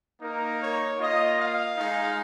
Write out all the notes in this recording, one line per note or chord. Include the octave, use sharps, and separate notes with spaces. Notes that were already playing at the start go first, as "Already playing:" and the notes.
A#3 D#4 A#4
C#5
A#3 F4 D#5
F5
G#3 D#4